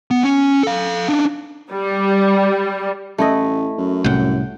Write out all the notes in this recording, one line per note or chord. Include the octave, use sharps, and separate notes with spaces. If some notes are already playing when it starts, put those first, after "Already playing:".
B3
C#4
A4 F5
D4 D#4
G3
A1 A3 E4 D#5
F#2
C2 A2 F#5 G5